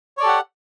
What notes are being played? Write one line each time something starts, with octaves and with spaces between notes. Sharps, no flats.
G4 A4 C#5 D5 F#5